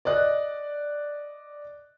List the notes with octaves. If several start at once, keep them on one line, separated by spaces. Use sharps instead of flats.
D5 D#5 F#6